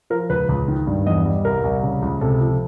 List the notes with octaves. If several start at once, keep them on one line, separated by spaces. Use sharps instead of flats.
F3 A#4
C#2 B4
C#2
D#3
G2
E2 D#5
G3
C2 A#4
C2
C#3
C#2
C3 A4
F3